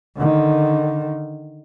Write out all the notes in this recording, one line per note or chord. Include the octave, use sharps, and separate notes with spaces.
D3 D#3